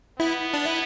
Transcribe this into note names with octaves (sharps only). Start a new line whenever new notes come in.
B3 E4
D4
E4